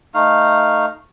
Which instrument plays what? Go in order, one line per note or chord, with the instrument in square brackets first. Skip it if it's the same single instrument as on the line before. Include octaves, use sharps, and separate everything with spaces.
[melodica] A3 D#4 F5